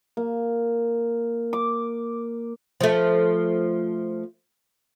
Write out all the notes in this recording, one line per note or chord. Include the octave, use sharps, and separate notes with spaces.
A#3
D6
F3 A3